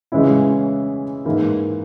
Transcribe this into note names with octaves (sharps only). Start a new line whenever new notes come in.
C#3 E3 G#3 C#4 E4
G#2 E3 A#3 E4